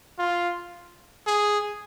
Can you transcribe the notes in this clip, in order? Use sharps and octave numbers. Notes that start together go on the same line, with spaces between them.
F4
G#4